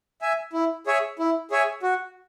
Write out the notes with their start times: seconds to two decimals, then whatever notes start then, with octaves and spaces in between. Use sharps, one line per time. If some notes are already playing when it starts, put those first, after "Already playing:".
0.21 E5 G#5
0.53 E4
0.86 G#4 C#5 E5 G#5
1.19 E4
1.51 G#4 C#5 E5 G#5
1.83 F#4